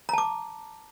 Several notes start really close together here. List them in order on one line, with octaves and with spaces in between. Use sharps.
A#5 A5 D6